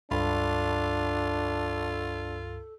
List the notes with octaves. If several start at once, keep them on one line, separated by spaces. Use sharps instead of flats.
C#2 G2 D4 F4 A4 B5